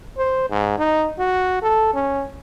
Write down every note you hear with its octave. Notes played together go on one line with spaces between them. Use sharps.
C5
G#2
D#4
F#4
A4
C#4